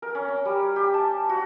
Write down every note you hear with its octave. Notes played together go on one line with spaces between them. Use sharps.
A#4
C#4
C#4
G3
G4
A5
F#4